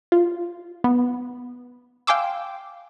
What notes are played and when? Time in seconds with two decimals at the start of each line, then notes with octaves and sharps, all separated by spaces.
0.12 F4
0.84 B3
2.07 F5 G5 G#5 C6 D6 E6